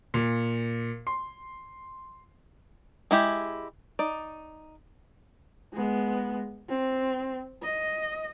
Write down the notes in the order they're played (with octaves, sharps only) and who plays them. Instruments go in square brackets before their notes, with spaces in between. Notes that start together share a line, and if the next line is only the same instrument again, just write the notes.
[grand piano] A#2
C6
[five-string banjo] G#3 E4 G4
D#4 D5
[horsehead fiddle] G#3 B3
C4
D#5